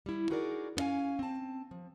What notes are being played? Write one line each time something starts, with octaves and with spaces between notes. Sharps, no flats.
G3 E4
D#4 F#4 G#4 A#4 C5 D5
B3 C#4 D#5 F5 G#5
C4 A5
F3